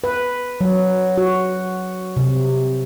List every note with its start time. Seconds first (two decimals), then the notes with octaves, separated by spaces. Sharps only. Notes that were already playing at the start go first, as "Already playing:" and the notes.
0.04 B4
0.61 F#3
1.18 F#4
2.17 C3